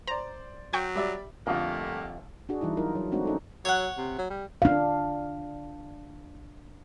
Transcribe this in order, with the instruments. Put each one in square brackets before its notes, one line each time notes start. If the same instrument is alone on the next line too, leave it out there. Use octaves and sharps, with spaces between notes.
[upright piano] C5 D5 [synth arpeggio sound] A#5
[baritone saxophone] F#3 [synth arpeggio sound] G5 C#6 G6
[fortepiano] G3 [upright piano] D5 E5 D6
[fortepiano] A1 D3 F4 [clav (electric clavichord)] F2 [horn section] G3 A3 A#3
[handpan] D4 F#4 G#4
E3 G3 D#4 E4
F#3 D#4 F4 A#4
F#3
G#3 A3 C4 D4 D#4 F#4
C#4 D#4 A4
[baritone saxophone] F#3 [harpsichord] C#5 F#5
[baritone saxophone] C3
F#3
G3
[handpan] D4 F5